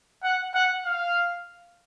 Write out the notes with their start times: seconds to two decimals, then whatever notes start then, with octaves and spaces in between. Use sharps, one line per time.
0.23 F#5
0.54 F#5
0.85 F5